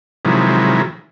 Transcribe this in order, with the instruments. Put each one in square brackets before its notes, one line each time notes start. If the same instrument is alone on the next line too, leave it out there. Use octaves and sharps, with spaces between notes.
[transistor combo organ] C3 D#3 F3 F#3 G#3 E4